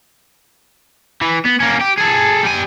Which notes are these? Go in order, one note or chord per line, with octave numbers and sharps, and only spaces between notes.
E3
B3
A#3 C#4
G4
G#4 A4
G3 G#5